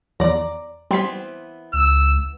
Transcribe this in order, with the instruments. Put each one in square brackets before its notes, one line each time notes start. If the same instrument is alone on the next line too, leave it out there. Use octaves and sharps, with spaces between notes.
[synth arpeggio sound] E2 [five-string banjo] D5 A#5
[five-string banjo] E3 B3 C4 [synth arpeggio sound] G3 B6
[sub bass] C#2 [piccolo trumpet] E6